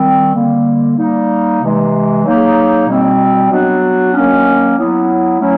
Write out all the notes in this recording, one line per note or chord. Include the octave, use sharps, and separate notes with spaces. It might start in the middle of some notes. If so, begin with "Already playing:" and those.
Already playing: D#3 G3 C4
D3 G3 A#3
G3 A#3 D#4
C3 E3 G#3
F#3 A#3 D#4 G#4
B2 G3 C4 D#4
F#3 B3 D4 F#4
D#3 F#3 A#3 C#4
F#3 B3 E4
F#3 A3 C#4 E4